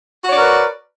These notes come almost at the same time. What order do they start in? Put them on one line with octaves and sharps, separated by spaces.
F#4 C#5 D5 A#4 B4